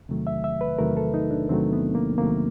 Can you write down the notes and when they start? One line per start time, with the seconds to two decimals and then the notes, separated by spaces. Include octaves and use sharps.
0.09 E2 C3 D#3 F#3 A3
0.27 E5
0.44 E5
0.61 B4
0.78 E2 C3 D#3 F#3 A3 A#4
0.97 A4
1.14 D#4
1.31 D4
1.49 E2 C3 D#3 F#3 A3 C4
1.73 B3
1.95 A#3
2.18 E2 C3 D#3 F#3 A3 A#3